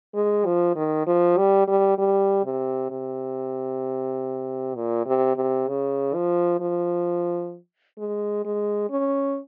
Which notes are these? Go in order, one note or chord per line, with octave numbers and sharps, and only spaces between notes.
G#3
F3
D#3
F3
G3
G3
G3
C3
C3
A#2
C3
C3
C#3
F3
F3
G#3
G#3
C#4